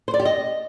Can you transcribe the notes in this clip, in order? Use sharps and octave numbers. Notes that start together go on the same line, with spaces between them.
C5
D5
G4
D#5